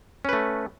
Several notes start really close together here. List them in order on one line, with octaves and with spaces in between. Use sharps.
C#4 B4 A3